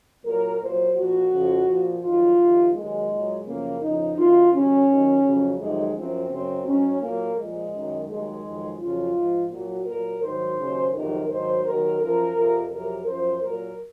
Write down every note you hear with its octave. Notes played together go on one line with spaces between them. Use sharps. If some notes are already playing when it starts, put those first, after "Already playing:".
A#2 F#3 A#4
A#2 F#3 C5
A#2 F3 F#4
F2 C#3 F3
A#2 F3
F2 D#3 F#3 F4
F2 C3 D#3
D#2 D#3 F#3 G#3
A#2 F#3
F#2 C#3 F3 A#3
F2 C#3 F3 D#4
F#2 D#3 F#3 F4
D#2 C#3 F#3 C#4
D#2 D#3 F#3
F2 C#3 F#3
F2 C3 D#3 F#3 G#3
F#2 F3 C4
F#2 C#3 F#3 C4
G#2 F#3 C#4
A#2 F#3 A#3
A#2 F3 G#3
F#2 D#3 F#3
D#2 D#3 F#3 G#3
F2 D#3 F#3
F2 C#3 F#3 F4
G#2 F3
A#2 F#3 F#4
A#2 F#3 A#4
G#2 D#3 F#3 C5
D#2 C#3 F#3
F2 C3 D#3 F#3 A#4
G#2 D#3 F#3 C5
D#2 D#3 F#3 A#4
F#2 F3 A#4
F2 C3 F3
F2 C3 F#3 A#4
F#2 F3 C5
A#2 F#3 A#4